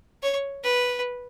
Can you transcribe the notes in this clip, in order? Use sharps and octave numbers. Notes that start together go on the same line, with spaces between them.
C#5
B4